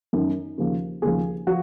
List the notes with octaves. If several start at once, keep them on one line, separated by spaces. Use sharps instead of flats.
F#2 D#3
D#2 C#3 F3
D#2 C#3 F3 G#4
F3 F#4